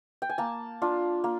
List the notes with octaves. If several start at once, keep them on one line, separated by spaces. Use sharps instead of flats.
G5
G#5
A#3 A5
D4 F4
A#3